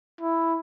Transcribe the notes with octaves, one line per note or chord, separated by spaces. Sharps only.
E4